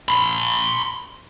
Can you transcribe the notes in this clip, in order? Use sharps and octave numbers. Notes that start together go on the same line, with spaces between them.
B5 C6